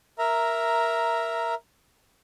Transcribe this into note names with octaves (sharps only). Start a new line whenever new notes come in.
A#4 E5 A#5